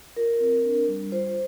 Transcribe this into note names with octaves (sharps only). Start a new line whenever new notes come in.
F4 A#4
C4
D4
G3
F4 C5